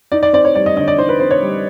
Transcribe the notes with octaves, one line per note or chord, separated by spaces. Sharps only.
D#4 D5
D5
C4 D5
C#5
G3 D5
D#5
D3 D#5
D5
D#4 C5
B4
C4 C5
C#5
G3